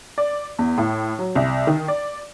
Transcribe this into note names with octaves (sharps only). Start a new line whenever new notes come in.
D5
E2
A2
F#3
C2
D#3
D5